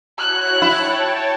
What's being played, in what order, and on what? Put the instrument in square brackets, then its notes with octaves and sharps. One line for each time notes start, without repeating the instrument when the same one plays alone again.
[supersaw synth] E4 F#4 C#5 [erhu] F#6
[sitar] E4 [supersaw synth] C#5 G5 A5